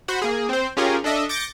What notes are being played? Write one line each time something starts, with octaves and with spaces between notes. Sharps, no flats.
F#4 C5 F#5 B5
A#3 G#4
C4 C5
C#4 F4 G4 G#4 A#4
D4 A4 D#5 E5
D6 G6 A6 A#6 C#7